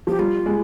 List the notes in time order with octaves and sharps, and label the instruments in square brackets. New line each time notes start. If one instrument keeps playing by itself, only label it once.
[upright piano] F3 [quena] G4
[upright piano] G3 [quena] F4
[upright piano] G#3